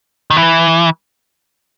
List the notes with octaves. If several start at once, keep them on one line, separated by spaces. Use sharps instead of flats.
D#3
E3